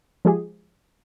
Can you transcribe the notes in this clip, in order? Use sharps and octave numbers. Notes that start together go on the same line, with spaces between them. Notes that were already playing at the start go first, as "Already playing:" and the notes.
F3 G#3 G4 G#4